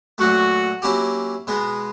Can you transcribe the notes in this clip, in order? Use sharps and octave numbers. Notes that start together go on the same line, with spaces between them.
A#2 F#3 A3 F#4
F#3 A#3 C#4 E4 G4
B2 G#3 B3